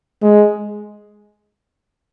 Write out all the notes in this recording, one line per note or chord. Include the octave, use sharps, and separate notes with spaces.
G#3